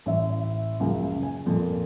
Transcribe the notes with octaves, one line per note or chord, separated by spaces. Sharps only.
A1 E5
C#2 F#2 C#3 F3
G#5
F2 A#2